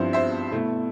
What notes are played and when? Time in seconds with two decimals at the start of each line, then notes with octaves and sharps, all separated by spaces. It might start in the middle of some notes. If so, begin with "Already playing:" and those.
Already playing: G2 F3 C4 E4 C5
0.13 C5 E5
0.52 B2 A3 E4